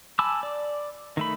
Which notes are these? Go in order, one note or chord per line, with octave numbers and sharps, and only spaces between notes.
G#5 A5 B5 D6 E6
D5
D#3 A3 B5